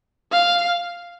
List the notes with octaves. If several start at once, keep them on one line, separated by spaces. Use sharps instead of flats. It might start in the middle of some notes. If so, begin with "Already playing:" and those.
F5